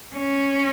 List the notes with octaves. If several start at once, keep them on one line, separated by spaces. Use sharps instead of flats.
C#4